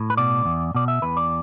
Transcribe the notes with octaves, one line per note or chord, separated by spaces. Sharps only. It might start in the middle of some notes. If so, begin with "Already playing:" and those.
Already playing: A2
B4
B2 D5
E2
B2 D5
E5
E2 B4
D5